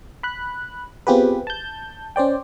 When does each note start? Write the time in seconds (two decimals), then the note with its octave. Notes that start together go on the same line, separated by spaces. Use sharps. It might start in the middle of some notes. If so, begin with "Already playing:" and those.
0.23 B5 F#6
1.07 B3 C4 F4 G4 G#4 B4
1.47 A5 G6
2.16 C#4 C5 D5 G5